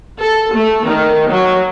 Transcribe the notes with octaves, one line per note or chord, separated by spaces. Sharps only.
A4
A3
D#3
F#3